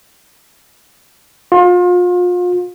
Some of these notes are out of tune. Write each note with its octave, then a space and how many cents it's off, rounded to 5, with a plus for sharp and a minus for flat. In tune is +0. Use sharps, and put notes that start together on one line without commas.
F4 +35